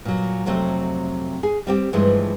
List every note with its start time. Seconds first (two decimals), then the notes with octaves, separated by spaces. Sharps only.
0.05 A#2 F#3
0.46 F2 C3 F#3 A3 C4
1.43 G#4
1.67 G3 C4 G4
1.93 G2 E3 F3 G#3 A3